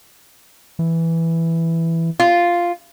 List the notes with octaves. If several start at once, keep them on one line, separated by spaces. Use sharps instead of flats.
E3
F4